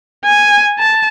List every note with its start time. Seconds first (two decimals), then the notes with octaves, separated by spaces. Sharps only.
0.25 G#5
0.79 A5